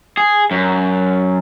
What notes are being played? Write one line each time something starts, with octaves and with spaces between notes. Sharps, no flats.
G#4
F#2